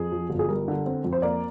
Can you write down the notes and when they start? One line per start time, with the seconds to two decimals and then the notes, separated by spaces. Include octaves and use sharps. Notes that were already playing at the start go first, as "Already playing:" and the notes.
Already playing: F2 G#4
0.12 F3
0.30 G1
0.39 G#4
0.49 G3 A#4
0.68 D3
0.86 C4
1.04 F2
1.13 C5
1.22 A#3 D5